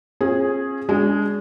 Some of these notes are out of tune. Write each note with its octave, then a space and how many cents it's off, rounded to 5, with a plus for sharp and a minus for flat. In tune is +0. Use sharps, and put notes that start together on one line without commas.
C#4 -45 F4 +0 G#4 +0
G#3 -15 D4 -35 G#4 +0